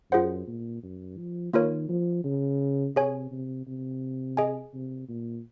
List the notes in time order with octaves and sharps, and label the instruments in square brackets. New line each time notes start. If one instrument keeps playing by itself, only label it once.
[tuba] F#2 [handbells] F4 G#4 C5 F#5
[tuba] A#2
F#2
F3
[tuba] D#3 [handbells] A#3 F4 A#4 C#5
[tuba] F3
C#3
[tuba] C3 [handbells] G#4 C#5 G#5
[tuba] C3
C3
[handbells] G#4 D#5 G#5
[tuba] C3
A#2